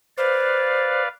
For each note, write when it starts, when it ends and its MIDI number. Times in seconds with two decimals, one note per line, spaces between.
0.18 1.08 71
0.18 1.02 72
0.18 1.08 74
0.18 1.08 77